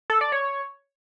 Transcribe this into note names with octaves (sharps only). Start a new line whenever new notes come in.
A4
D5
C#5